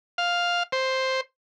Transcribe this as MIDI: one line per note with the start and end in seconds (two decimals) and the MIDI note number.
0.18 0.63 77
0.72 1.21 72